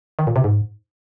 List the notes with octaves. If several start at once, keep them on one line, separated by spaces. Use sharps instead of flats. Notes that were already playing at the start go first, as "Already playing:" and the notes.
D#3
A#2
C3
G#2